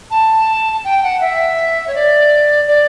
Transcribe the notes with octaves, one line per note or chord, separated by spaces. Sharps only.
A5
G5
F#5
E5
C#5
D5
D5